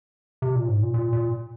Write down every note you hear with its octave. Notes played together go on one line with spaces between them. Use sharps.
C3
A#2
G#2
A#2
A#2
A#2